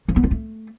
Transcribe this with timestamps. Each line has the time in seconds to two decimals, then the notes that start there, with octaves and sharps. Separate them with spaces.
0.08 F3
0.16 B3
0.24 F4
0.31 A3